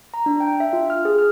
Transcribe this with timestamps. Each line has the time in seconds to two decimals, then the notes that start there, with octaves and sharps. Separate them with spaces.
0.14 A#5
0.26 D4
0.40 G5
0.60 E5
0.73 F4
0.90 F6
1.05 G#4
1.19 F6